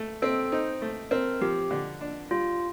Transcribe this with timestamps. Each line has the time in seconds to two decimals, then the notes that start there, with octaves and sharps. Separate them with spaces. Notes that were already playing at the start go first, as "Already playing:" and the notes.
Already playing: A3
0.22 C4 A4
0.52 D#4 C5
0.82 A3
1.11 C4 A#4
1.41 F3 G4
1.71 D3
2.01 D4
2.31 G3 F4